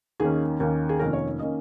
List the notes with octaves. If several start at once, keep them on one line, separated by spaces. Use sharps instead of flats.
D#2 D#3 A#3 C#4 G#4
D#2 D#3 A#3 C#4
G#4
F1 F2 D#3 A#3 C#4 A#4
C#5
D#3 A#3 C#4 D#5